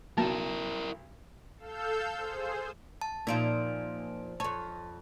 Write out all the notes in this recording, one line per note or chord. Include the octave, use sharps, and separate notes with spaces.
B1 E4 A#4 A5
A4 F5 E6 G6
G#4 C5
A5
A#2 F3 A#3 D#4 F4 D7
F2 C#5 A5